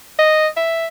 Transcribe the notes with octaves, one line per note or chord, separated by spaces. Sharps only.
D#5
E5